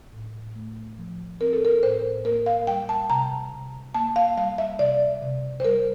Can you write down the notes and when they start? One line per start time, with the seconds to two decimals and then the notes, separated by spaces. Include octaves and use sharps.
0.13 A2
0.56 A3
0.98 F3
1.40 C4 A#4
1.53 A4
1.65 A#4
1.83 A2 C5
2.25 A#3 A#4
2.46 F5
2.67 G3 G5
2.89 A5
3.10 C3 A#5
3.52 C3
3.94 A#3 A5
4.16 F5
4.37 G3 F5
4.58 E5
4.79 C3 D5
5.22 C3
5.60 C5
5.64 G3 A#4